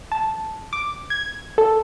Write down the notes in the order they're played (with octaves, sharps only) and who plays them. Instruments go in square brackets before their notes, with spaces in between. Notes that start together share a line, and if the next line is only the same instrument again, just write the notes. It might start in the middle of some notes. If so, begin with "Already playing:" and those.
[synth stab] A5
D6
G#6
A4